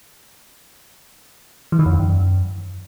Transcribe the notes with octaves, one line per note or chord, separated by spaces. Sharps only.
E3
D#3
F2
E2
F#2